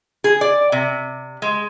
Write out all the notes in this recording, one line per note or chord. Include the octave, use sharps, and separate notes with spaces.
G#4
D5
C3
G#3